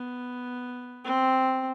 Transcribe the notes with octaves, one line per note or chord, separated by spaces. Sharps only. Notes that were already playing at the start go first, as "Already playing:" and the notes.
Already playing: B3
C4